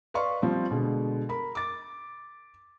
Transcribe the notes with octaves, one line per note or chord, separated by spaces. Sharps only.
B4 D5 D#5 F5 C6 C#6
F3 G3 C4
B2 D3 G#3
A#4 B5
D6 A6